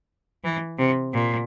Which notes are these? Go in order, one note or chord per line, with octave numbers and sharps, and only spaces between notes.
E3
C3
A#2